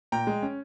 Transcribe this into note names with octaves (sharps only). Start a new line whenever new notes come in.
A#2 G5 A#5
G#3
C#4